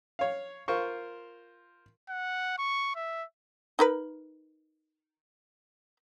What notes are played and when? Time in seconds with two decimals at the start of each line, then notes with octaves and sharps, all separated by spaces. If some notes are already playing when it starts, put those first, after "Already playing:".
0.19 C#5 F5
0.68 F4 A#4 C5 C#6
2.09 F#5
2.58 C#6
2.95 E5
3.79 D#4 A#4 B4